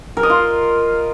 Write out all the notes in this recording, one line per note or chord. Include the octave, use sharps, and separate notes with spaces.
A#4
D#5
F4